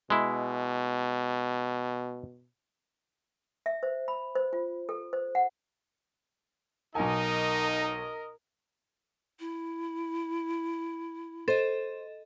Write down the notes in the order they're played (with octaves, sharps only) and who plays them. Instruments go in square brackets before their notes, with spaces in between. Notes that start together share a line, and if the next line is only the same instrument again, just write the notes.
[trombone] B2 [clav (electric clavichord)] G#3 E4
[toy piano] E5
C5
B5
C5
F4
A4
C5
F#5
[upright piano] B1 G#5 [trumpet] D#4 [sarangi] A#4 [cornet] D#5
[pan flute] E4
[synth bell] A4 D#5 [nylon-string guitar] C5